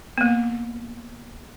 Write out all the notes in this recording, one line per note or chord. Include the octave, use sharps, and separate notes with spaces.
A#3 B3